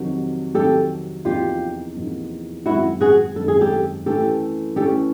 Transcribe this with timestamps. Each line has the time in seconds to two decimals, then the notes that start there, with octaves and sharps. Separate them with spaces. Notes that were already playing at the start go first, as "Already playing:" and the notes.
Already playing: F2 C3 D#3 F#3
0.54 F2 C3 D#3 F#3 G4 A4
1.25 E2 C3 F3 A#3 D#4 F4 G4
1.95 E2 C3 F3 A#3 D#4
2.66 F#2 D#3 G#3 C4 E4 F#4
3.01 F#4 G#4
3.36 F#2 D#3 G#3 C4 A4
3.48 G#4
3.61 G4 A4
4.06 E3 A3 C#4 G4 A4
4.76 E3 A3 C#4 G4 A4